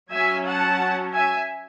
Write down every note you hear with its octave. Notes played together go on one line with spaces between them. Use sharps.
F#3 C#4 E5 G#5
F#5 A5
E5 G#5